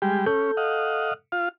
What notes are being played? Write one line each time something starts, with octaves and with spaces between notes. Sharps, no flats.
G3 G#3 G4
C#4 A4 G6
D#5 F5 F#5
F4 F5